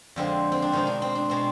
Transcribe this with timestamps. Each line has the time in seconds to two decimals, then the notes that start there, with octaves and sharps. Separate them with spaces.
0.16 F2 D3 G#3 C4
0.52 C4
0.62 D4
0.72 B2 D#3 G#3 C4 D#4
0.87 D4
1.02 C4
1.15 D4
1.30 B2 G#3 C4